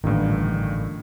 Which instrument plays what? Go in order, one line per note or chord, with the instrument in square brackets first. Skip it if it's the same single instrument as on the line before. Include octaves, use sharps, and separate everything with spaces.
[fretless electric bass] A1 D3 [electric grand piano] G2 A#2 D#3